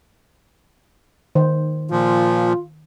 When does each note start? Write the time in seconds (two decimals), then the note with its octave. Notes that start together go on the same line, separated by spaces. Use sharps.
1.35 D#3 C5
1.91 A#2 F3 F4